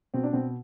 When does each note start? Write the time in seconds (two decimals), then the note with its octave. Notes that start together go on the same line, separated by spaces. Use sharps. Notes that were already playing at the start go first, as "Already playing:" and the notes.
0.14 B2 C4
0.24 D4
0.33 B2 C4